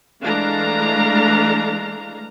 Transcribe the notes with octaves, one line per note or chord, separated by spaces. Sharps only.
E3 G#3 A3 D4 F5 A#5